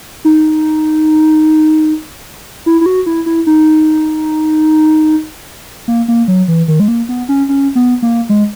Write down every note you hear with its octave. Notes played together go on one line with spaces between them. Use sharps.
D#4
E4
E4
F#4
E4
E4
D#4
A#3
A#3
F#3
E3
D#3
G#3
A#3
B3
C#4
C#4
B3
A#3
G#3